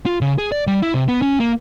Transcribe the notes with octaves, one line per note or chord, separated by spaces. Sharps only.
F4
C#3
G#4
D5
G3
E4
C3
B3
C#4
A#3